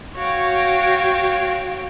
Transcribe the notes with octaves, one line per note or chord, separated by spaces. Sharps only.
F#4 C#5 F5 G5